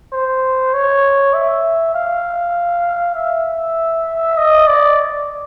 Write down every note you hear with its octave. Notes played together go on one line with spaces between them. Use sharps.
C5
C#5
E5
F5
E5
D#5
D5